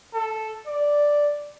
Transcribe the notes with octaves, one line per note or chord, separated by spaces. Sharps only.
A4
D5